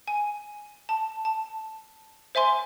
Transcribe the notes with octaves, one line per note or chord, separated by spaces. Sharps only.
G#5
A5
A5
C5 E5 G#5 C6